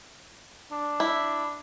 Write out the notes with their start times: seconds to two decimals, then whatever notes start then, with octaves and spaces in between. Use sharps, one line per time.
0.71 D4
1.00 E4